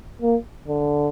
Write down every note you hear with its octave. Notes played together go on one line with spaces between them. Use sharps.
A#3
D3